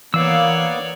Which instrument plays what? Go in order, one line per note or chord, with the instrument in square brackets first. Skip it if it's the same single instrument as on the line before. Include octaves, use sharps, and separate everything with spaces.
[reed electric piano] E3 [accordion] A#3 B3 [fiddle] C#5 D5 [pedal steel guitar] F5 E6